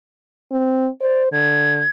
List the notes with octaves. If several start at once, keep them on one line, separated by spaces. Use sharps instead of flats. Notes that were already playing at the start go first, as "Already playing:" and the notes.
C4
C5 D5
D3 G#6